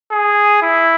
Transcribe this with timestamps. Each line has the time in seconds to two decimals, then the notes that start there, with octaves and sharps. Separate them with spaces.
0.11 G#4
0.63 E4